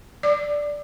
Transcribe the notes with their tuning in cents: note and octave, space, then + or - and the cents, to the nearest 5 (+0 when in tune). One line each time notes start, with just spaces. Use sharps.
D5 -5 D6 +35